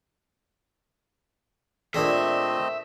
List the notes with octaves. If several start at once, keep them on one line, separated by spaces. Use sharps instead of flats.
A#2 A3 C4 D4 G#4 D#5 E5